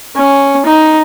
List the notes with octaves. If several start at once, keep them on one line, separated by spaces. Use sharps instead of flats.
C#4
D#4